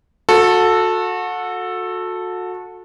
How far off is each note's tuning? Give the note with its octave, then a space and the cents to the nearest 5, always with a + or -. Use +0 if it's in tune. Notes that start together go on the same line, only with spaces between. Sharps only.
F#4 -30 A4 +0